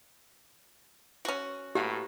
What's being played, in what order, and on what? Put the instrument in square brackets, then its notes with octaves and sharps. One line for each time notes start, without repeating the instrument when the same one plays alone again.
[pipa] C#4 F#4
[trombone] A2 [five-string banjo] A#3 F#4 B4 [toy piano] G4